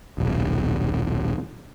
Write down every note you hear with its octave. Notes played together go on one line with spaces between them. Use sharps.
D#1 B1